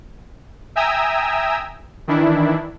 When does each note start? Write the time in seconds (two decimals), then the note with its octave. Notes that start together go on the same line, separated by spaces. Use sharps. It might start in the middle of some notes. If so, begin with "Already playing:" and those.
0.76 E5 G5 G#5 A#5 D#6 E6
2.08 D#3 E3 D4 E4